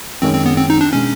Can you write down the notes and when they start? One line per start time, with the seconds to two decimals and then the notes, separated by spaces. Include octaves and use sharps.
0.22 F#2 D#3 G#3 C4 C#4
0.34 C4
0.46 B3
0.57 C4
0.70 D#4
0.81 D4
0.93 B2 G#3 C#4